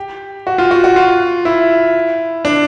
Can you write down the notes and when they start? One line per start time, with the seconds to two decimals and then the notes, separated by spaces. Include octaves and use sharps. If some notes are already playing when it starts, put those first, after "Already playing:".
Already playing: G4
0.47 F#4
0.58 F4
0.71 F#4
0.84 F#4
0.96 F4
1.45 E4
2.45 D4